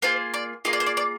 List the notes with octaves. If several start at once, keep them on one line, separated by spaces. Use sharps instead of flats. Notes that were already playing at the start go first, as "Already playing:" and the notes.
A#3 F4 G#4 C5
D5
A#3 F4 G#4 D#5
D5
C5
D5
D5